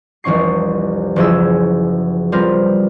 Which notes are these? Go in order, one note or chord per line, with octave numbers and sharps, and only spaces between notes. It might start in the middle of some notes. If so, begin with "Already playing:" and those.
F1 C2 E3 C#4 C#6 C7
F#1 E3 F3 E4 G#4 E6
G3 C4 F4 A#4 B4